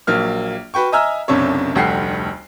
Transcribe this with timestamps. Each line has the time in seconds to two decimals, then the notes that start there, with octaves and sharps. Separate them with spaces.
0.07 A#1 F#3 A#3 F6
0.74 F#4 B4 G5 C#6
0.92 D#5 E5 G#5 A#5 E6 F6
1.28 F#1 B1 F#2 C3 D4 C#5
1.75 F1 D2 G3 F#5 G5 C7